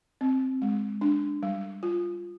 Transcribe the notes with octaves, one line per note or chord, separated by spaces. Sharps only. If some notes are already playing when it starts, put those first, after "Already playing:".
C4
G#3
D4
G3
F4